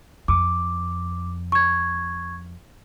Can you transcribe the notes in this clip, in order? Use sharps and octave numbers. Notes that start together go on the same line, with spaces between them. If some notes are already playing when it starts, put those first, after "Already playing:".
F2 D6
C#6 G#6